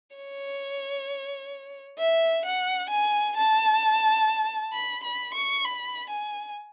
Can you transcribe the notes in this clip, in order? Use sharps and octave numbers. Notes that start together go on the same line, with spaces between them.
C#5
E5
F#5
G#5
A5
B5
B5
C#6
B5
G#5